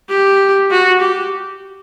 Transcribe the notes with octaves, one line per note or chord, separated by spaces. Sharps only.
G4
F#4
G4